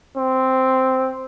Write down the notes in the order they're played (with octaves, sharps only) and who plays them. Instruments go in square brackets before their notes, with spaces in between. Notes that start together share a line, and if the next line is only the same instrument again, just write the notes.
[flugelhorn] C4